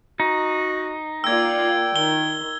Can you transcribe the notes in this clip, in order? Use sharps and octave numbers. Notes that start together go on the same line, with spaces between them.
D#4 F#4
A#3 F4 D5 G5 E6 G#6
D#3 G7